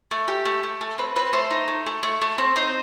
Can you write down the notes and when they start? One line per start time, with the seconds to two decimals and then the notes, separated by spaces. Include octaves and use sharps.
0.11 A3
0.28 G4
0.45 A3
0.63 A3
0.81 A3
0.98 C4 B4
1.16 C4 B4
1.33 A3 C5
1.51 D#4
1.68 A3
1.86 A3
2.03 A3
2.21 A3
2.38 C4
2.56 D#4 C5